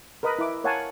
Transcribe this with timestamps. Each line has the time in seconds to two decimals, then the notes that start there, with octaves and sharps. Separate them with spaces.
0.23 A#4 B4 D#5 B5 D#6
0.39 E4 D6
0.64 A#4 C#5 F5 F#5 G#5 A5